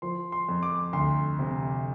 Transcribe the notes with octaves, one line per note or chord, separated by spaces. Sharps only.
F3 C6
C6
F2
D6
D2 C6
C3